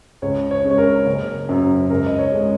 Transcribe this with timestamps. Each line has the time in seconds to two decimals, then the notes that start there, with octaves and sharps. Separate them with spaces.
0.22 C#2 C#5
0.51 C#5
0.65 C#3 G#3
0.71 C#5
0.78 A#4
1.06 F#1
1.49 F#2 F#3
1.90 C#2 A#4
2.06 D#5
2.19 C#5
2.32 C#3 G#3